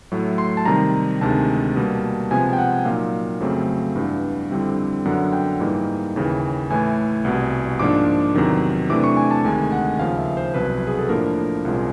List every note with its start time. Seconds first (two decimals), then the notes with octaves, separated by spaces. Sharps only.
0.12 A2 F#3 A3
0.38 C6
0.57 A5
0.65 C3 D#3 G3 A#5
1.21 D2 C3 D#3 G#3 A5
1.76 B2 G3 A#3
2.31 C3 F3 G#3 B3 G#5
2.53 G5
2.58 F#5
2.85 A#2 F#3 A#3 D#4 F5
3.40 F2 C#3 F#3 A3 C4
3.96 G2 E3 G3 B3
4.50 F2 D3 G3 C4 E4
5.05 F#2 D3 F#3 B3 F#5
5.33 G5
5.60 G#2 E3 G3 A#3 D#4
6.16 D#2 C#3 E3
6.70 A2 E3 A3 G#5
7.25 C2 B2 G3
7.79 G#2 F3 A#3 D4 D6
8.35 E2 C3 D#3 F#3
8.90 C3 E3 A3 D4 D6
9.04 C#6
9.17 G#5
9.31 A5
9.44 D2 C3 D#3 G#3 G#5
9.72 F#5
9.99 D#2 C#3 F3 F5
10.18 E5
10.37 C5
10.54 C2 B2 F#3 B4
10.87 G#4
10.98 A4
11.09 A2 F3 A#3 D4 A#4
11.65 C2 A#2 F3 G#3 C#4